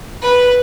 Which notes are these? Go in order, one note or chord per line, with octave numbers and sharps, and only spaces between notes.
B4